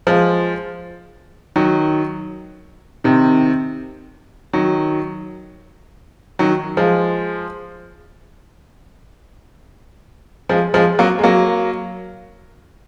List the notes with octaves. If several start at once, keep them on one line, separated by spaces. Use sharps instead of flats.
F3 G#3
D#3 F#3
C3 D#3
D#3 F#3
D#3 F#3
F3 G#3
F3 G#3
F3 G#3
F#3 A#3
G#3
F#3 A#3